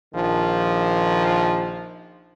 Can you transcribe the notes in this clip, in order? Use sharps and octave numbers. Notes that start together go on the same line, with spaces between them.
A#1 D#3 F3